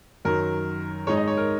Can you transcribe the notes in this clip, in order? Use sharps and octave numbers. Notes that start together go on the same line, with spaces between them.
F#2 D#3 F#3 A#4
G#2 G#3 D#4 C#5
D#5
C#5
A#4